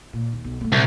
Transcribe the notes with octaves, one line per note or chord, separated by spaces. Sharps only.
A#2
D#2
B1
A3 A#3
C2 A#2